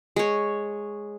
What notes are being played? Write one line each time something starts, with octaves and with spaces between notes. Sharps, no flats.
G#3 C#5